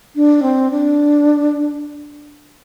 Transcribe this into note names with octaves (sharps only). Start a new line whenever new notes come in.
D4
C4
D4